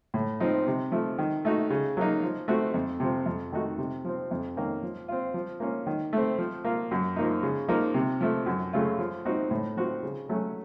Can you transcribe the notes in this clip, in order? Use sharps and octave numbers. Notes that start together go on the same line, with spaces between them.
A2
F3 C4 D#4
C3
F3 A3
D#3
A3 D#4 F#4
C#3
F#3 A#3 D#4
F3
A3 C4 F#4
F2
C3 F3 C4
F2
D#3 A3 D#4 F#4
C3
F3 C4
F2
D#3 A#3 C#4
F3
C4 F4
F3
A#3 C#4 F4
D#3
A3 C4
F3
A#3 F4
F#2
F3 A#3 D#4
C#3
F3 A#3 D#4
C3
F3 A3
F#2
C#3 A3 C#4 F4
F3
C4 D#4 F#4
A2
F3 C4 F#4
C#3
F#3 A3 C#4